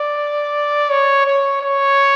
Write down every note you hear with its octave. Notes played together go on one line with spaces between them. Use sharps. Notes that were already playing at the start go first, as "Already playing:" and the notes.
Already playing: D5
C#5
C#5
C#5